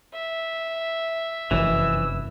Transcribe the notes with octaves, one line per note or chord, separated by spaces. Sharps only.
E5
F1 F#2 E3 E6